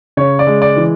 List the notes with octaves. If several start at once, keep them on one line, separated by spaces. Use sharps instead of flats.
C#3 C#5
D5
G#3
D5
E3